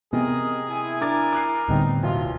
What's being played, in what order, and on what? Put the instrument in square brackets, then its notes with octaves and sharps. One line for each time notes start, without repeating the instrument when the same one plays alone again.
[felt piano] C3 [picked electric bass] B3 [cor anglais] G#4 [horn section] A#4 D#5
[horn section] E4 G#5
[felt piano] D4 D6 A6 [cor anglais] A#4
[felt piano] D6 F#6 C7
[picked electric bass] D1 D2 [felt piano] G3 B3 C4 [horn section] D#4
[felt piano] B1 [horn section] E3 F4